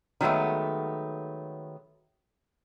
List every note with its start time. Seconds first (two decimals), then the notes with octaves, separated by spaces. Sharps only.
0.21 D#3 F#3 G#3 A3 B3